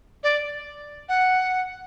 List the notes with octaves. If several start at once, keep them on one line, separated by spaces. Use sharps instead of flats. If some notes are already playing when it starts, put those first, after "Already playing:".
D5
F#5